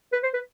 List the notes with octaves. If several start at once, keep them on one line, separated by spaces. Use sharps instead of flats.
B4
C5
B4